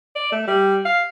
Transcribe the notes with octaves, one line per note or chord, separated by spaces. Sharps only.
D5
A3
G3
F5